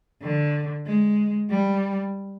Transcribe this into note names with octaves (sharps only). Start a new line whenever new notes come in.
D3
G#3
G3